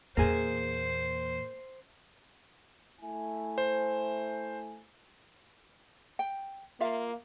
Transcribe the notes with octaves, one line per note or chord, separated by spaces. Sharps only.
E2 A#2 A#3 G#4 C5
A3 E4 G#5
C5
G5
A#3 F4 E5 F5